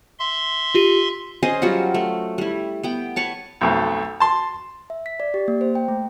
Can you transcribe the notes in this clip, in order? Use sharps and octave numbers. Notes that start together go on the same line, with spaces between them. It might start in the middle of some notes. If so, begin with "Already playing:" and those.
E5 C6
F4 G4 D#7
C#4 G#4 C5 D#5
F#3 G3 F4 F#4
A3
G3 E4
B3 G5
B4 C#5 A5
B1 F2 A3
A5 C6
E5
B6
D5
G4
A#3
C5
G5
A3